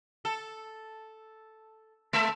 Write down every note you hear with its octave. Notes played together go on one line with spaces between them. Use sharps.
A4
G#3 A4 E5